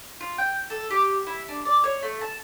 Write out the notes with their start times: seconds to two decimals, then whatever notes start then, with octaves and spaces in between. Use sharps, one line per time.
0.21 F4
0.38 G5
0.70 A4
0.90 G4
1.27 E4
1.48 D4
1.65 D5
1.84 C#5
2.02 A3
2.21 A5